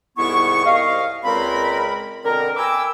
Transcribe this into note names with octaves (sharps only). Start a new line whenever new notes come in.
C2 G#2 B3 E4 C#6
C2 D#5 F5
C#2 A#2 G#3 C4 A#4 B5
B2 D3 C4 A#4
G5 G#5 B5 D6 E6